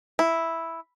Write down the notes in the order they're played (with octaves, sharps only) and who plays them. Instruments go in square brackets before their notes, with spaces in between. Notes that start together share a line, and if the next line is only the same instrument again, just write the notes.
[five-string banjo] E4